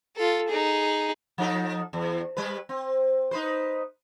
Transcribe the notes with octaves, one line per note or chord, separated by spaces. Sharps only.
F4 A4
D#4 G#4
F3 D#4 A4
E2
G3 B4
C4
D#4 B4 C5